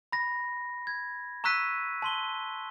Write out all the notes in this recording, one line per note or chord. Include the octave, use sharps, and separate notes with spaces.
B5 A#6
G#6
A#5 C#6 E6 F#6 B6 D#7
A5 C6 G7